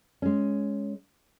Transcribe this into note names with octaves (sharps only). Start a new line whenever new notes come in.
G#3 C#4